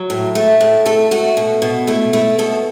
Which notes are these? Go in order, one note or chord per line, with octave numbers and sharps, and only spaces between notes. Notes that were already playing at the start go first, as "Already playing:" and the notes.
Already playing: F#3
A2
A3
A2
A3 A4
A3 F#4
B2
B2
A3 E4
A3 E4
B2 A4